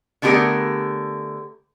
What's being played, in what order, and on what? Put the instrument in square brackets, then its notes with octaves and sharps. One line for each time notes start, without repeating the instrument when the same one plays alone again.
[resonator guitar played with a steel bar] D3 A3 B3 G4 G#4 A#4